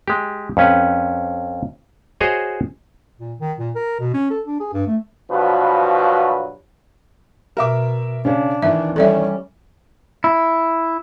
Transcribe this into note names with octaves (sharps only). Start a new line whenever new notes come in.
G#3 G4
F2 C#4 B4
F#4 G#4 C5 C#5 D#5
A#2
D#3
A#2
A#4
B2
C#4
A4
D4
G#4
G2
A3
G2 B2 F3 F#3 F#4 B4
B2 A#4 E5 D6
C#3 C#4 D4
D#3 E3 E5
G3 C#4 A4 D5 E5
E4